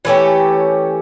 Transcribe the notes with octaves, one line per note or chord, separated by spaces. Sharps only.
E3 A3 C#4 G4